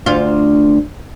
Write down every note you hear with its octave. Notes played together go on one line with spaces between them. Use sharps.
D2 F4